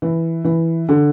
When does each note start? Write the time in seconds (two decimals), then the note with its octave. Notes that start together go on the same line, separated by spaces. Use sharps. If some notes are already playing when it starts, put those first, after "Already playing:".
0.02 E3
0.45 E3
0.89 D3